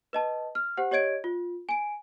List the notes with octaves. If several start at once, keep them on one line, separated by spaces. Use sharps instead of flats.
B4 D#5 A5
F6
G4 C5 F#5
G4 C#5 D#5 G#6 D7
F4
G#5 D7